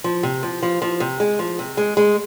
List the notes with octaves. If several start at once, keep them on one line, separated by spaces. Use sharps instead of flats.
F3
C3
F3
F3
F3
C3
G#3
F3
C3
G#3
G#3